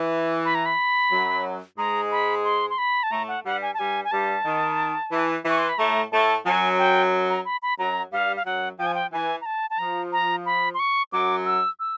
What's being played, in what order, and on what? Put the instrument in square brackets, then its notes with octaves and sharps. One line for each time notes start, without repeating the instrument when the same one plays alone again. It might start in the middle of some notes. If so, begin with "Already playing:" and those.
Already playing: [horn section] E3
[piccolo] B5
A#5
B5
[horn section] F#2 F#3
[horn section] G#2 G#3 [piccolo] A#5
[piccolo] B5
C6
C6
B5
A5
[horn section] A2 A3 [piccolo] A#5
[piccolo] F#5
[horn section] G2 G3 [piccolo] F#5
[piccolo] G#5
A5
[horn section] G2 G3 [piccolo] G#5
[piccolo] G#5
[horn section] G2 G3 [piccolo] A5
[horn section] D#3
E3
[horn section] E3 [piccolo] C#6
[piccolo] C6
B5
[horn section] A2 A3 [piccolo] A#5
[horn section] A2 A3 [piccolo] A5
[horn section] F#2 F#3 [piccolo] G#5
[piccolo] G5
A#5
B5
B5
[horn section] F#2 F#3 [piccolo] A#5
[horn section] G2 G3 [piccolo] F5
[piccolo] F5
[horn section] F#2 F#3 [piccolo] F#5
[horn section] F3 [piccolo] G5
[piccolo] G#5
G5
[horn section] E3 [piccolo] G#5
[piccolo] A#5
A5
A5
[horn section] F3 [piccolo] A#5
[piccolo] A#5
B5
C6
C#6
[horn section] F#2 F#3 [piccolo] D6
[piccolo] E6
E6